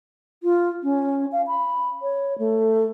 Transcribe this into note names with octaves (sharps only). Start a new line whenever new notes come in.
F4
C#4
F5
B5
C#5
A3